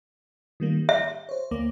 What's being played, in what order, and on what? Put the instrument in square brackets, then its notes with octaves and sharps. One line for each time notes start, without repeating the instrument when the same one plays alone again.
[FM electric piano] D#3 G3 A#3
[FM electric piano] G4 [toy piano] E5
[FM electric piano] C5 C#5
D2 A#3 D6